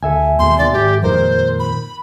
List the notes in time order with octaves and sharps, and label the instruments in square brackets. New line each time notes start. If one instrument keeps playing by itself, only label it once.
[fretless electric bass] D2 [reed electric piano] A4 E5 G#5
[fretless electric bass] D#2 B2 G#3 [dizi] C6
[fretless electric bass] D#2 B2 D#3 [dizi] D5
[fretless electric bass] G#1 [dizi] G4
[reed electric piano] F2 A#4 [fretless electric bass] A#2 D#3 G#3 [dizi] C5
[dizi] B5